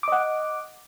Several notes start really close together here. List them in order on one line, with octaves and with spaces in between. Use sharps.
D6 D#5 F#5